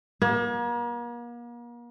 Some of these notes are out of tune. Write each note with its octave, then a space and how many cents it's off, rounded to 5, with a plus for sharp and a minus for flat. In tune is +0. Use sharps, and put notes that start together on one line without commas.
A#3 +40